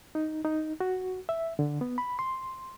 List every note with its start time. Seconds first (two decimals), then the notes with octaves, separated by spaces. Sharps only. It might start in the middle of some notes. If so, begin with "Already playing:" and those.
0.15 D#4
0.45 D#4
0.80 F#4
1.29 E5
1.59 D3
1.81 B3
1.98 B5
2.19 C6